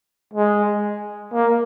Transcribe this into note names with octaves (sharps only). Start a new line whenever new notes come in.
G#3
A#3